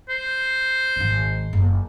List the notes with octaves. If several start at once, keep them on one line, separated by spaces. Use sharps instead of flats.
C5
G#1 C3
F#1